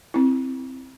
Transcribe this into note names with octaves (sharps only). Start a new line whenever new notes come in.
C4 E4